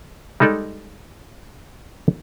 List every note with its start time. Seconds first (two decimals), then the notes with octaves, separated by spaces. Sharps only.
0.40 G3 G#3 D#4 A4 D5